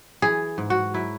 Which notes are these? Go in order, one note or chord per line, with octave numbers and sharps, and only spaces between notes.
E3 G#4
G#2
F#4
F#3 E4